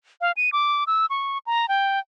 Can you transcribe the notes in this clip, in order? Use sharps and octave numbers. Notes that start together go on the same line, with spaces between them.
F5
D#7
D6
E6
C#6
A#5
G5